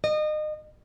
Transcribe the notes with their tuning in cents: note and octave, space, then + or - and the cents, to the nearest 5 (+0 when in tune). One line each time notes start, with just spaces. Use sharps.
D#5 -30